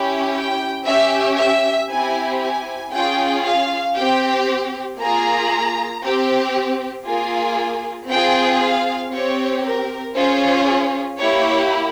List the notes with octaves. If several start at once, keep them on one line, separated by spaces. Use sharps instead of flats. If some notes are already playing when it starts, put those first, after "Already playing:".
Already playing: C#4 E4 G4
G5
C#4 G4 E5
E5
C4 E4 G4 G#5
G#5
C#4 F4 G#4 G5
F5
C4 G4 G5
A#3 F4 G#4 A#5
C4 G4
A#3 F4 G#4 G#5
C4 F4 G#4 G5
F5
C4 G4 C#5
A#4
C#4 F4 G#4 C5
A#3 E4 G4 C#5